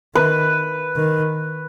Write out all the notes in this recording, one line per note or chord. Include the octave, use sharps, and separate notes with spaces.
D#3 B4
D#3